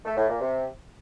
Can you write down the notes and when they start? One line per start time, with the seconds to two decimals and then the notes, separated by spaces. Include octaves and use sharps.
0.05 A3
0.17 A2
0.29 A#2
0.41 C3